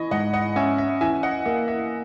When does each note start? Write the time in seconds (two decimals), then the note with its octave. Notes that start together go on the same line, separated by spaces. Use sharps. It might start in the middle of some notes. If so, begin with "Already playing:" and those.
Already playing: E3 D#5 G#5 B5 C#6
0.11 G#2 D#5 F#5
0.33 D#5 F#5
0.56 C#4 E5 G#5
0.78 E5
1.01 E3 E5 G#5
1.23 D#5 F#5
1.45 A#3 E5
1.68 E5